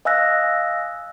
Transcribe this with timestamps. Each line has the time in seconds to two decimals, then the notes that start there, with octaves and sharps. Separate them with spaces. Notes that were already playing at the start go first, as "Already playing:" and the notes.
0.05 D#5 F5 G#5 E6 F#6 A#6